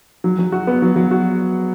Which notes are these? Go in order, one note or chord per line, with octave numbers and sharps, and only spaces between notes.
F#3
F#3
F#4
B3
F#3
F#3
F#4